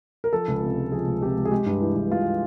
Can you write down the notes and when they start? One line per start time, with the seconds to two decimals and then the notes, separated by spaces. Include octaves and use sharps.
0.24 A#4
0.33 F3 A4
0.48 C#2
0.63 C3
0.77 G#3
0.92 F3 G#4
1.07 C#2
1.22 C3 G4
1.36 G#3
1.45 G#4
1.51 G#3 G4
1.66 G2
1.81 E3
1.96 G2
2.11 G#3 F4